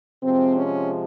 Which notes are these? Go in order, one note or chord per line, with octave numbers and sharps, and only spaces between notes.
C3 F3 G#3 C4
C#4